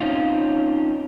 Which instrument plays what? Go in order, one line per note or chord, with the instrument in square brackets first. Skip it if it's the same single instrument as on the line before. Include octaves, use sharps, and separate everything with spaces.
[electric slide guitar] C4 C#4 D#4 F4